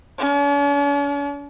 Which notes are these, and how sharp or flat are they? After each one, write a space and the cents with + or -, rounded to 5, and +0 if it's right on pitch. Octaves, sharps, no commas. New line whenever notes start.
C#4 +45